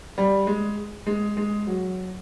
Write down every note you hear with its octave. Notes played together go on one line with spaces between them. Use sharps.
G3
G#3
G#3
G#3
F#3